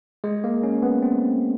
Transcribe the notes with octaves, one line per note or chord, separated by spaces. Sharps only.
G#3
A#3
C#4
B3
C4